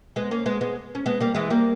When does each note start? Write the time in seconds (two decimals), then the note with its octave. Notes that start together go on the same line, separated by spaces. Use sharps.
0.16 G#3 B3
0.31 A#3 C#4
0.46 G#3 B3
0.61 G#3 B3
0.95 C#4
1.06 G#3 B3
1.20 G3 A#3
1.35 E3 G#3
1.50 G3 A#3